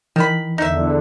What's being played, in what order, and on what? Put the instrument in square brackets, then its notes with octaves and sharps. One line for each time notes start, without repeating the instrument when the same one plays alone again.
[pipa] D#3 B5 [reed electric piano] E3
[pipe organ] E2 D3 [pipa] D#4 E5